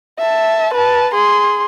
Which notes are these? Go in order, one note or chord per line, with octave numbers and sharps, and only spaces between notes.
E5 A5
B4 A5
G#4 C6